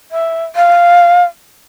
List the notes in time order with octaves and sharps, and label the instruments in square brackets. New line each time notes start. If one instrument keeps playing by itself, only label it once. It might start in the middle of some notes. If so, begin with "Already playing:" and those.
[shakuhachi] E5
F5